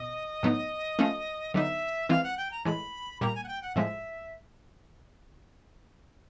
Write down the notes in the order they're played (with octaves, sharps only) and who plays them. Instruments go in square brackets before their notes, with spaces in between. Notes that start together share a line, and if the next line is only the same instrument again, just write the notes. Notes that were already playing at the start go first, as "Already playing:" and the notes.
Already playing: [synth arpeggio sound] B2 [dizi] D#5
[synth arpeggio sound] A2 F#3 B3 D#4
F3 A3 C#4 F4
[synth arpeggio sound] D3 F#3 B3 D#4 [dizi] E5
[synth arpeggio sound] E3 G#3 C4 F4 [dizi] F5
[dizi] F#5
G5
A#5
[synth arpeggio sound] A2 E3 G#3 [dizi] B5
[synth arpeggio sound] A#2 G3 A#3 [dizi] A#5
[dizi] G#5
F#5
G5
F#5
[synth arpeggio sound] A2 F3 G#3 [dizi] E5